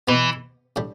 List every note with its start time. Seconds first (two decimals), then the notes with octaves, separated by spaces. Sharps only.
0.08 B2 E3 B3 G4
0.76 A2 G3 D4 G4